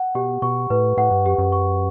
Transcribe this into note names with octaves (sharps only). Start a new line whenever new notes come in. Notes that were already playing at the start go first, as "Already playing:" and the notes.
Already playing: F#5
B2 G4
B2 C#6
A2 B4
A2 F#5
G2
F#2 G4
F#2
C#6